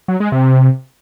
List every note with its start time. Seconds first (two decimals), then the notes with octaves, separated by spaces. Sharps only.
0.08 F#3
0.20 G#3
0.32 C3